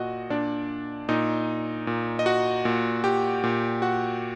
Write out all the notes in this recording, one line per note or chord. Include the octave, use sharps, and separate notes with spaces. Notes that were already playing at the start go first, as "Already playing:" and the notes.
Already playing: A#2 F#4 D#5 F#5
A#2 D4 D5
A#2 D#4 D#5
A#2
D#5
F#4 F#5
A#2
G4 G5
A#2
F#4 F#5